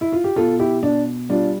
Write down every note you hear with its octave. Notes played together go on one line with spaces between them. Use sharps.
E4
F4
G4
B2 F4 A4
E4 G4
B2 D4
G3 D4 F4